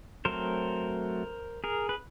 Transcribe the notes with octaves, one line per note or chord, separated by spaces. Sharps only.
F#3 A3 C4 A#4 C5
G#4 A#4
B4